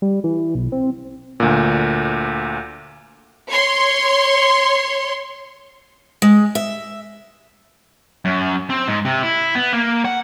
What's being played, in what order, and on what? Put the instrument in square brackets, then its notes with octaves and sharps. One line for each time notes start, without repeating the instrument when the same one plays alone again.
[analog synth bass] G3
E3
B1
C4
[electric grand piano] D2 A#2
[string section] C#5 C6
[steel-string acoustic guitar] G#3
E5
[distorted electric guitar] F#2
C4
G#2
C3
E4
B3
A#3
F#5